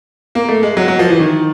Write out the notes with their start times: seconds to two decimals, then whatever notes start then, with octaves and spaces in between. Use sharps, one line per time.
0.35 A#3
0.49 A3
0.63 G#3
0.77 F#3
0.88 F#3
0.99 F3
1.10 E3
1.20 D#3